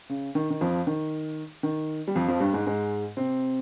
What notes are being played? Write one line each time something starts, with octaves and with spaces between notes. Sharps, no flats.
C#3
D#3
D#3
F2 F3
D#3
D#3
G3
F2 F3
F2 F3
G2 G3
G#2 G#3
G#2 G#3
C3 C4